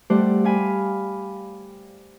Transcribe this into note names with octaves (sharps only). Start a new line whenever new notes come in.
G3 A3 G4 C5 D5 F#5
G4 F5 G#5 B5